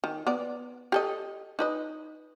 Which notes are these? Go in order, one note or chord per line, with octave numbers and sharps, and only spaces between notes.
D#3
B3 D5
G4 A4 D#5
D#4 B4 D#5